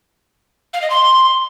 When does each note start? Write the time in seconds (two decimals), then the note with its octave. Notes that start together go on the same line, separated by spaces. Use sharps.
0.74 F5
0.82 D#5
0.90 C6